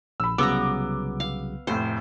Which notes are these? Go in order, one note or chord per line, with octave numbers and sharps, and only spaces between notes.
A#1 B5 E6
C2 C#3 F#3 B3 A#5 D6 E6
F5
F1 A2 C5